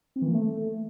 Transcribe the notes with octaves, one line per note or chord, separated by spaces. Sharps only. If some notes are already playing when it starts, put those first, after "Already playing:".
C4
E3
A#3
A3